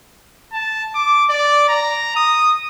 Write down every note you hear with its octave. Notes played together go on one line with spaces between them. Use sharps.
A5
D6
D5
A#5
D#6